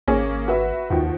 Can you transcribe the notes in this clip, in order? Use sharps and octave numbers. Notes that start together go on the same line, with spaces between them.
G#1 A#3 C#4 G#4
F#4 B4 E5
D#2 D#3 F3 F#4